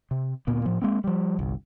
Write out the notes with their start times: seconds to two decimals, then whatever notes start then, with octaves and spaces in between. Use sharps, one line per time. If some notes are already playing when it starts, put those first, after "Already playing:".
0.11 C3
0.47 D2 A#2 A#3 B3
0.65 A2 F3
0.82 G#3 A#3 C4
1.04 F3 G3
1.39 G1 C2